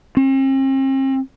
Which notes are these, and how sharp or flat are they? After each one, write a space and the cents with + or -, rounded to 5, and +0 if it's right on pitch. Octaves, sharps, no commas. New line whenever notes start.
C4 +45